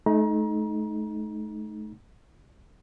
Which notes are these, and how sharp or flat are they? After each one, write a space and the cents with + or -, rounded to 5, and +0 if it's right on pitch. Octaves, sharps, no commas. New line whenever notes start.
A3 -35 D#4 +0 A#5 +30